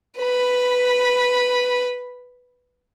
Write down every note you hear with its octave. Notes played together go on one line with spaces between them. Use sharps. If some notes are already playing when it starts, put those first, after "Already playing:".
B4 B5